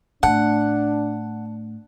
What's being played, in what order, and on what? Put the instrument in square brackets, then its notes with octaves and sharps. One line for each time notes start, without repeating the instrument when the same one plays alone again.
[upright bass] A2 [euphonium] D4 [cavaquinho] F#5 [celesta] A5